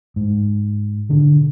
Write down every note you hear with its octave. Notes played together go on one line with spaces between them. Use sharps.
G#2
B2 D3 D4